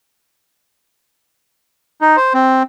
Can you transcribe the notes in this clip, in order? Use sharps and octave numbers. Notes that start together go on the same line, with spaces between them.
D#4
C5
C4